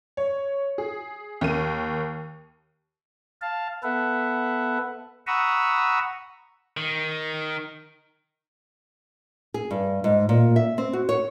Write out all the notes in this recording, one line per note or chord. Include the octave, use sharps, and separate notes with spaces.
C#5
G#4
D#2 A#4 D#7
F5 A5
B3 A4 B4 E5 F#5
F#5 A#5 B5 C#6 D#6 E6
D#3
G#4
G2
G#2
A#2
E5
C4
F#4
C#5